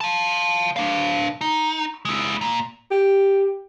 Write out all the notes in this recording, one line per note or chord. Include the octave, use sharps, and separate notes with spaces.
F5 A5
D4 F5
D#4
G#3 E4
A#2
G4